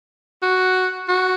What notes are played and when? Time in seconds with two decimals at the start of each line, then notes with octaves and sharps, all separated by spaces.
0.42 F#4
1.09 F#4